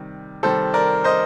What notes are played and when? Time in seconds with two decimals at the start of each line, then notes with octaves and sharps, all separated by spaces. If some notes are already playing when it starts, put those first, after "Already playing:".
Already playing: C3 D#3 G3
0.43 C3 D#3 G3 A4 C5
0.74 A#4 D5
1.04 C5 D#5